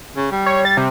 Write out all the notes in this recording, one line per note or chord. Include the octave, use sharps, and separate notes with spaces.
C#3
G3
C#5
A6
C3